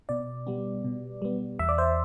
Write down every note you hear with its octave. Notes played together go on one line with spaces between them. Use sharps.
B2 D5
G3 B3
B2
G3 B3
E2 E5
D5
C5 E5